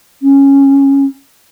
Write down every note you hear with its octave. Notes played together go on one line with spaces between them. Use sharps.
C#4